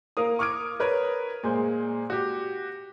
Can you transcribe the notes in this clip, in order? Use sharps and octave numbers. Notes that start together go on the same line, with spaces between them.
A#3 A#4 F5 D#6
C#6 D6 F6 G#6 D7
A#4 B4 C#5
A#2 G#3 C5
F#4 G4